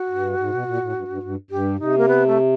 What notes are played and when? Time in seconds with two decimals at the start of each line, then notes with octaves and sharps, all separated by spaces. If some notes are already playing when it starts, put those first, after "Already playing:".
Already playing: F#4
0.09 G2
0.38 G#2
0.51 B2
0.65 A#2
0.80 A2
0.94 G2
1.08 G2
1.23 G2
1.51 G2 G4
1.79 C3 D#4
1.98 A#3
2.08 B3
2.27 A3